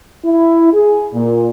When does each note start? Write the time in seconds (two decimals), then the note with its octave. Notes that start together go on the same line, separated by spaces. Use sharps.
0.24 E4
0.73 G#4
1.14 A#2